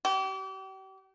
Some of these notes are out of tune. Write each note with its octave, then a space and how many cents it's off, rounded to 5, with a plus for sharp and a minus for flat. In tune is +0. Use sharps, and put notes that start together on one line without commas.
G4 -40